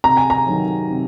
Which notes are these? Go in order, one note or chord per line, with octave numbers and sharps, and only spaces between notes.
C3 A#5
G#5
A#5
D#3 F#3
C3